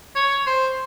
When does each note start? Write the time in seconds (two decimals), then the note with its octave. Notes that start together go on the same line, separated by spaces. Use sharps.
0.15 C#5
0.47 C5